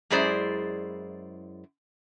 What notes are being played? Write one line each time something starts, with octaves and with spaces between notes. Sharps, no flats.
F#2 G#3 E4 G#4 C5 D5